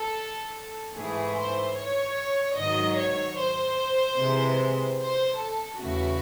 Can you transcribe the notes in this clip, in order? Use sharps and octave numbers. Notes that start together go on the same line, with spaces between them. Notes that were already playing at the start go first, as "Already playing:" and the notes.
Already playing: A4
G#2 E3 A3 G#4
C5
C#5
G#2 D#3 F#3 D#5
C#5
C5
C3 E3 G#3
C5
A4
E2 C#3 E3 A3 F#4